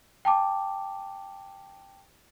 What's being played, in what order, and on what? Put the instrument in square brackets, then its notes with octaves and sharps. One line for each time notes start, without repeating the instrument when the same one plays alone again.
[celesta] G5 A5 D6